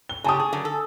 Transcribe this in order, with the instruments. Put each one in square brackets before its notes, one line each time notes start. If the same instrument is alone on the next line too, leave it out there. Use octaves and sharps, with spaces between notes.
[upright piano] G7
[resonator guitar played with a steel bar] C#3 G4 [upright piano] G#5 A5 D#6
[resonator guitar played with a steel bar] G#4
F#2 D3
A4